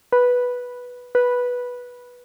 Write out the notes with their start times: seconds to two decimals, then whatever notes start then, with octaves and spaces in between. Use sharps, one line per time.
0.12 B4
1.15 B4